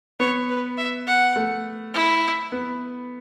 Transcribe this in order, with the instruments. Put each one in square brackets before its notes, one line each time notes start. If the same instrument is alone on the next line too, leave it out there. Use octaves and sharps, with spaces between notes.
[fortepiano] B3 [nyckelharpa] C#5
[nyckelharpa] B4
E5
F#5
[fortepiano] A3
[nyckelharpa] E4
[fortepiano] B3